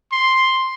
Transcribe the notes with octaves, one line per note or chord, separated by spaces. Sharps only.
C6